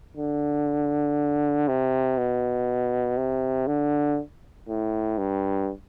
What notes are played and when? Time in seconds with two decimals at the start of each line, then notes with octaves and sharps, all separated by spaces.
0.17 D3
1.68 C3
2.18 B2
3.17 C3
3.67 D3
4.68 A2
5.18 G2